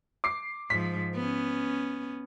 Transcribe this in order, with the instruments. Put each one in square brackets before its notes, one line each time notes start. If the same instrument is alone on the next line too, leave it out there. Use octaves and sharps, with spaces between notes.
[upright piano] D6 C7
[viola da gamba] G#2 F3 [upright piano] B6
[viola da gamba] B3 C#4